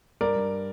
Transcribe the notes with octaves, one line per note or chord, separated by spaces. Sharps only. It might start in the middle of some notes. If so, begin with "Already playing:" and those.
G2 A#4 D5
G2